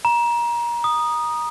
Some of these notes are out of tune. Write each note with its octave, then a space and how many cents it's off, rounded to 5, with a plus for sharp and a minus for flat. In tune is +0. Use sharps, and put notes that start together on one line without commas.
A#5 +25
D#6 -10